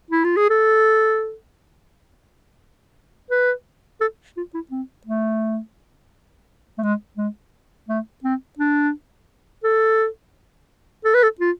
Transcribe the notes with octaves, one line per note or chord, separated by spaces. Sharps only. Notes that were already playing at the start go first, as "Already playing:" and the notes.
E4
F4
G#4
A4
B4
A4
F4
E4
C4
A3
A3
G#3
G#3
A3
C4
D4
A4
A4
B4
A4
F4